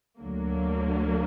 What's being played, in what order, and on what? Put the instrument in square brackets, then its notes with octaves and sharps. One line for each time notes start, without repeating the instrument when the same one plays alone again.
[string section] D2 D3 F#3 A#3